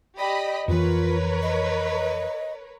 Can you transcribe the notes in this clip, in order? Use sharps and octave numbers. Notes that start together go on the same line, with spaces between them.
G4 D5 D#5 B5
F2 E3 F4 A#4 B4 C#5
D#5